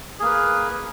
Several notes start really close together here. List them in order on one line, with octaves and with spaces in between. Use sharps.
G#4 A#3 B4